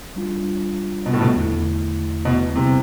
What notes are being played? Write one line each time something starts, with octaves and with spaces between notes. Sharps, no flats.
G3 D4 F4
B2
A2
B2
E2 D3 A3 E4
B2
C3 G3 B3 E4 A4 C5